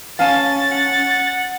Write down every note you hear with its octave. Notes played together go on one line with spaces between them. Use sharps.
C#4 F5 G#5 A5 A6
F#5